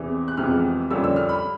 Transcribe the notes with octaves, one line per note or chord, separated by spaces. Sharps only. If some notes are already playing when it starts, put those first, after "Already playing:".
Already playing: E2 C3 E3
F#6
F2 C3 E3 G#3 B3 F6
F2 D3 G3 A#3 C#4 E6
E6
F6
B5